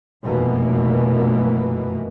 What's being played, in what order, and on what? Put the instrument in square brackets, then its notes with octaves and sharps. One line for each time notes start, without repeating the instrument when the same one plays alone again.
[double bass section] F1 F#2 B2 E3 A#3